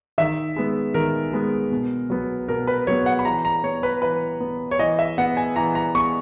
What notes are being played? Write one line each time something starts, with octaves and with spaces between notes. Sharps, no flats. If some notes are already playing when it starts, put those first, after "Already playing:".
D#3 E5
G#3 B3
D#3 A#4
G#3 B3
B2
F#3 B3
B2 A#4
B4
F#3 B3 C#5
F#5
B5
E3 A#5
A#5
B3 C#5
B4
E3 B4
B3
C#5
E3 D#5
E5
B3 F#5
G#5
E3 A#5
A#5
B3 C#6